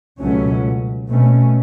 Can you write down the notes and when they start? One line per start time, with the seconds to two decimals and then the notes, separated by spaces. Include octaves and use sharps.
0.20 C#2 B2 F#3 A3 C#4
1.09 B2 A3 C#4